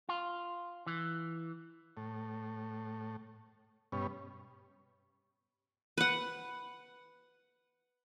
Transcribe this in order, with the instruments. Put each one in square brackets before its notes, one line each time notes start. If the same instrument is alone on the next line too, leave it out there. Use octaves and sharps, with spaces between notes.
[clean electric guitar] F4
E3
[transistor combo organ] A2
G2 B2 C#4
[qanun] B4 F#5